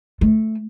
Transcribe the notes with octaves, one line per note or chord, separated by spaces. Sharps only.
A3